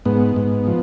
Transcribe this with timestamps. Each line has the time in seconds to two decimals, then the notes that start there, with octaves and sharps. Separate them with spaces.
0.05 G#2 B3
0.36 G#2
0.67 F3